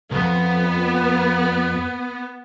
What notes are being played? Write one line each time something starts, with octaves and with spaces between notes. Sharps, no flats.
C2 F2 B3